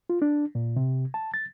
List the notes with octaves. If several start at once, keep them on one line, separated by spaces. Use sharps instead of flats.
F4
D4
A#2
C3
A5
A6